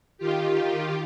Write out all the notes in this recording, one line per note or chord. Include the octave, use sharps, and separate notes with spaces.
D#3 F4 G4